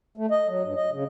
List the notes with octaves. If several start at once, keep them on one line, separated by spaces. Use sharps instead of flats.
A3
D#5
F#3
G2
D#5
C#3